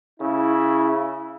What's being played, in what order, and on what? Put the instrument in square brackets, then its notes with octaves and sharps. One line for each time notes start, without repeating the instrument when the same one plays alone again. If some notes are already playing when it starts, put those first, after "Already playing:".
[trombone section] C#3 E4